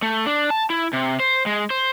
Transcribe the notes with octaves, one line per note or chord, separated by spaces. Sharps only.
A3
D4
A5
E4
C3
C5
G#3
C5